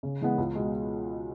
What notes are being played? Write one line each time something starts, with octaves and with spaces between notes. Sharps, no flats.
C#3
E3 G#3 B3
C#2
B2 G#3